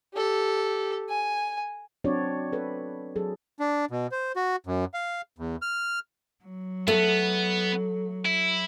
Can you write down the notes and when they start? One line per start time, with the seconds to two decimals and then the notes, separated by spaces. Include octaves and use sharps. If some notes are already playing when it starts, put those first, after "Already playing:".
0.14 G4 A4
1.09 G#5
2.04 F#3 C4 D4 F#4 C#5 D5
2.52 A4 B4
3.16 F#3 G#4 A4
3.60 D4
3.91 B2
4.12 C5
4.36 F#4
4.66 F#2
4.94 F5
5.38 E2
5.62 F6
6.45 F#3
6.88 A3 B3
8.25 E4